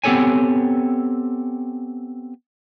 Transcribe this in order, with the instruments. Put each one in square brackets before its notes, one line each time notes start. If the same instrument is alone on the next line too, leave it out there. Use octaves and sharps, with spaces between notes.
[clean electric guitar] B3 C4 G4 A4 C#5 G#5